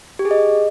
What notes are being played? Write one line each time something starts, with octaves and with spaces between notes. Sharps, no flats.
G4
G#4
D#5